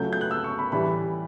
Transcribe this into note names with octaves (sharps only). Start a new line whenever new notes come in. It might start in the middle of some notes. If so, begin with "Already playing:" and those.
Already playing: C#2 C#3 F#3 A3 G6
G6
F#6
E6
C#6
B5
A2 E3 G3 B5